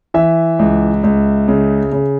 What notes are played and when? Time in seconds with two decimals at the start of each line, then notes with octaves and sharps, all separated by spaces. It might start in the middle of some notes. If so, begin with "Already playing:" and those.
0.14 E3 E5
0.59 C#2
1.03 C#2
1.48 C#3
1.92 C#3